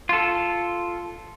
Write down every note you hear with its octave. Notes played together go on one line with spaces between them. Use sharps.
F4 A4